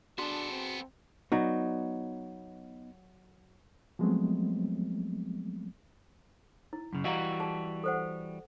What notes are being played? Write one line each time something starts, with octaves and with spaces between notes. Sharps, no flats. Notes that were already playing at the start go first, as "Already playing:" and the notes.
B3 D4 F#4 G#4 A4 C6
C4
F#3 B3 D#4 D5
F3 F#3 G#3 A3 B3 C4
E4
F#2 C#3
E3 G3 F#4 D#5 F5 A#5
G#4 A5
A4 C5 F#5